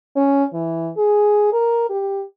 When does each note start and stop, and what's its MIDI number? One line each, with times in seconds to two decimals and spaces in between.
0.16 0.44 61
0.53 0.90 52
0.97 1.53 68
1.53 1.85 70
1.90 2.23 67